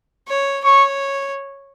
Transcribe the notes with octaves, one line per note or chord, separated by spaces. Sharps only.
C#5
C#5 C#6